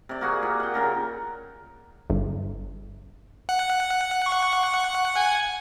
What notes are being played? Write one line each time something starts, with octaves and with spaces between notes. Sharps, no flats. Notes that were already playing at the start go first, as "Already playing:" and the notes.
C3 D5
A#3 F#4 G#4
A#2
F#5 G5
A#2 C#3 A#4
G1
F#5
C#6
G#5